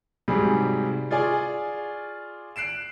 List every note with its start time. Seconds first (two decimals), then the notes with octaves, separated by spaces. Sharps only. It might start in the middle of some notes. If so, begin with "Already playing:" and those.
0.28 G#2 C3 F#3 G3 G#4
1.11 F4 G#4 D5 G#5 C#6
2.56 F#6 C7 D7 E7